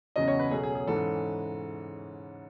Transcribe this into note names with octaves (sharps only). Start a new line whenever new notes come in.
E2 C#3 F#3 C#4 D#5
C#5
B4
B2 F#3 A3 C#4 G#4
G#4
G#4
G#2 E3 G#3 C#4 A4